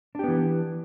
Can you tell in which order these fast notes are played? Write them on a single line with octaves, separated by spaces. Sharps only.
D4 G4 B3 E3